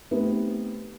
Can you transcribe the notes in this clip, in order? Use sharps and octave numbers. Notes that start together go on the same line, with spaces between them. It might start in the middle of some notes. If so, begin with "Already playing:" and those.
A3 B3 C4 D#4 G4